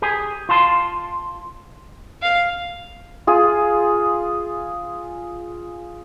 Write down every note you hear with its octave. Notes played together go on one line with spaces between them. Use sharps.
G4 G#4 G#5
F4 F5 A5 C6
F5
F4 G#4